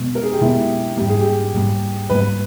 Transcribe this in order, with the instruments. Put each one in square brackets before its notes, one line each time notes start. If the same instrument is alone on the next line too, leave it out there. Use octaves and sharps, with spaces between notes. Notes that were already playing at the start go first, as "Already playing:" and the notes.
Already playing: [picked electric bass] B2 G#3 B3
[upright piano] A#4
G#4
G4
[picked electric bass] B2 G#3 B3 [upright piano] E4
[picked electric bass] G#2 G3 A#3 [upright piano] G4
[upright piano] G#4
G4
[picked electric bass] G#2 G3 A#3
[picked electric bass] G#2 G3 A#3 [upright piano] B4